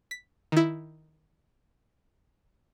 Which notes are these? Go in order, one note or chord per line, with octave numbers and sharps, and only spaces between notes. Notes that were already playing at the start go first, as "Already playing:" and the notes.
B6
D#3 E4